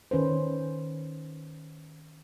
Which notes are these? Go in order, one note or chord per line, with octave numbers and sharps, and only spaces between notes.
D#3 C#4 B4 C5